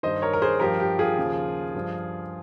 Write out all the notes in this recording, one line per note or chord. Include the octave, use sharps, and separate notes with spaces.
G2 D#3 C5 D#5
A#4 C#5
A#4
G#4 C5
G2 F3 G4 A#4
G4
F4 G#4
D#2 C#3 F3
G2 F3